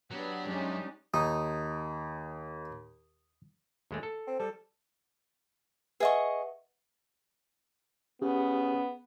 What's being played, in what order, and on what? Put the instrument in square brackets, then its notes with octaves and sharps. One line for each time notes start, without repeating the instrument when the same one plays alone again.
[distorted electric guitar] F#3 [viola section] B3 [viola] D4 G4
[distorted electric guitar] B1 F#2 [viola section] G#3 C#4 D#4
[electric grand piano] D#2 [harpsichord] D#4 [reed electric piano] D#6
[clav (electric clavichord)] D#2 G#3 A3
A4
[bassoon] C4
[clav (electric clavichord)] G3 [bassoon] A4
[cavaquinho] G#4 D#5 C#6 [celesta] B4 E5 F#5
[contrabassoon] C#3 [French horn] B3 [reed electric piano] G4